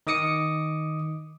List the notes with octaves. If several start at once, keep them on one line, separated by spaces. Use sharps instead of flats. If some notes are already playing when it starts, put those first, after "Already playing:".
D#3 D#5 D6 D#6 C#7